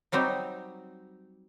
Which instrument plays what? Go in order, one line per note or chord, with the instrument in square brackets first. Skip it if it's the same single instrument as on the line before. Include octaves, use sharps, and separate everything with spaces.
[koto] F#3 G3 C4 D#4